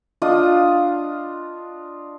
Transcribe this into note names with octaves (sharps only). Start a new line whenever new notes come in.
D4 F4 D#5 D#6